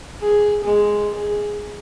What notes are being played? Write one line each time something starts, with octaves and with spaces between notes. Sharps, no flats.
G#4
G#3
G#4